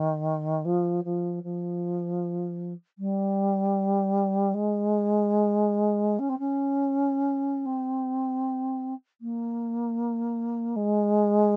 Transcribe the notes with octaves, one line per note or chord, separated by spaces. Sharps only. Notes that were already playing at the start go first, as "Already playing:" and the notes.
Already playing: D#3
F3
F3
F3
G3
G#3
C#4
C4
C#4
C4
A#3
G#3